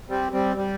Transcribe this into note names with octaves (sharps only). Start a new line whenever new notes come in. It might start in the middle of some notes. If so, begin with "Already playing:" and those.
G3 C4
G3 C4
G3